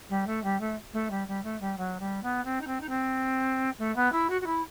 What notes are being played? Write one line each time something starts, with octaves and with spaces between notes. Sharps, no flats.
G3
A3
G3
A3
A3
G3
G3
A3
G3
F#3
G3
B3
C4
D#4
C4
D#4
C4
A3
B3
E4
F#4
F#4
E4